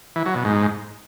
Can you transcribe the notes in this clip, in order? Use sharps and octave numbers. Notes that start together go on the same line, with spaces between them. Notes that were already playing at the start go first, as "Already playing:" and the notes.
E3
F#3
B2
G#2